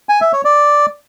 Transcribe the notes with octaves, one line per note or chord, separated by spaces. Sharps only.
G#5
E5
C#5
D5